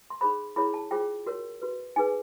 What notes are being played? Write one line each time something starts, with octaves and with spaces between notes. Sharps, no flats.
C6
D#4 G#4 C5 B5
E4 G#4 C#5 B5
A5
F4 G#4 C5 G5
F#4 A#4 C#5
F#4 B4
D#4 G#4 B4 G#5